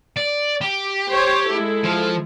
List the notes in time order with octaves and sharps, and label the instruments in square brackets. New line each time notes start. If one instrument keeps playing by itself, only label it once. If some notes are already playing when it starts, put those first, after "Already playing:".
[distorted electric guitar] D5
G4
[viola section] C5 C#5
G#3 E4 A4
[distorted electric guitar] F3